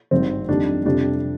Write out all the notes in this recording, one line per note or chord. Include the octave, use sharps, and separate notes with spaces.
G#1 G2 D#3 C4
F2 D#3 G3 D4
F2 C3 G3 D4